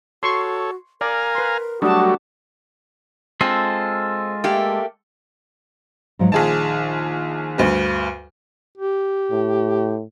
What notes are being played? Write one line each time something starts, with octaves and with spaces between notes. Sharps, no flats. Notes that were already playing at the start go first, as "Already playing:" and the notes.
F#4 A4 C#5 C6 C#6
A#4 D5 F5 G#5 A#5
B4 C6
F#3 G3 A3 D4 F#4 A5 D#6
G#3 C4 F4 A4
A3 A#3 G4
G#2 F3 F#3
A#1 D#3 G#4 A5
D2 G2
G4
A2